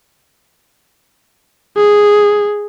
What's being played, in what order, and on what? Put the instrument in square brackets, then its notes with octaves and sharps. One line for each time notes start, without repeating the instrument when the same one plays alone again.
[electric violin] G#4